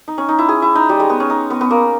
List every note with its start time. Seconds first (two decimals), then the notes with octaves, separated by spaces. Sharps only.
0.08 D#4
0.18 C#4
0.29 D#4
0.39 E4
0.49 G#4
0.62 E4
0.75 D#4
0.89 G3
1.00 G#3
1.10 B3
1.20 C#4
1.30 D#4
1.50 B3
1.61 B3
1.71 A#3